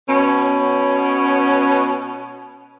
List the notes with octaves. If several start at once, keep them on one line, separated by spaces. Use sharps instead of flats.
B2 B3 C#4